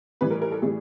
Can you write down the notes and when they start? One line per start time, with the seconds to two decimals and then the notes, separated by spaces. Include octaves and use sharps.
0.21 A2 E3 G3 B4
0.31 A#4
0.42 A#4
0.51 A4
0.62 A2 E3 G3 G#4